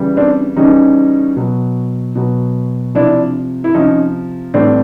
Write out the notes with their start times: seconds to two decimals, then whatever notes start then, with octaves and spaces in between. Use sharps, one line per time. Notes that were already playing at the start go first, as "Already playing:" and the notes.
Already playing: C#3 E3 G3
0.17 C4 D4
0.56 C#3 E3 G3 C#4 D#4
1.37 B2 F#3
2.16 B2 F#3
2.95 C3 F3 D4 E4
3.64 E4
3.74 C3 F3 C#4 D#4
4.54 A2 E3 G3 C4 D4